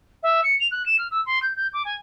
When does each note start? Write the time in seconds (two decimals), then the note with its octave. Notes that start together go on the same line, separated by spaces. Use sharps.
0.23 E5
0.44 C#7
0.60 F7
0.71 F#6
0.86 E7
0.99 F6
1.11 E6
1.26 C6
1.42 G6
1.56 G6
1.73 D6
1.85 G#5